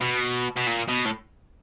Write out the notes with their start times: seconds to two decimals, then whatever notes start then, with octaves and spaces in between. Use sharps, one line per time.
0.01 B2
0.56 B2
0.67 A#2
0.88 B2
1.05 A2